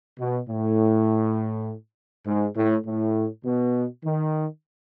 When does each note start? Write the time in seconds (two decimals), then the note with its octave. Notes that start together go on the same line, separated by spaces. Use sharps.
0.20 B2
0.50 A2
2.27 G#2
2.57 A2
2.86 A2
3.45 B2
4.05 D#3